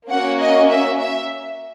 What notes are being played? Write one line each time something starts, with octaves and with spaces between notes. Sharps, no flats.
A#3 C#4 F#4 F#5
D#5
E5
E5